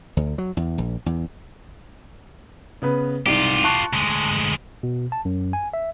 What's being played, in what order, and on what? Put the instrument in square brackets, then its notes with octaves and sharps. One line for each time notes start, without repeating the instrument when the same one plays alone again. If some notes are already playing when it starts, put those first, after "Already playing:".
[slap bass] D2
F#3
E2
A#1
E2
[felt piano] C#3 B3 B4
[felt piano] C2 G#2 [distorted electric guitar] F4 G4
[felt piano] A5 C#6 F#6
[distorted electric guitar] D2 G#3
[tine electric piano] B2
A5
F#2
G#5
E5